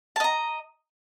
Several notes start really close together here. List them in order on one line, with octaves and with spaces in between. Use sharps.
A5 D#5 A#5